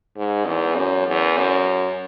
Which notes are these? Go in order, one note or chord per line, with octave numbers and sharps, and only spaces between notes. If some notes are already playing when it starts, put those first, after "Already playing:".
G#2
E2
F#2
E2
F#2